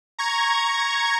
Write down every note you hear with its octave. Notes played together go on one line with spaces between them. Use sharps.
A#5 C#6 G#6